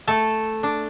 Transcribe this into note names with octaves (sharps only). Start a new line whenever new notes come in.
A3 A4 A5
D4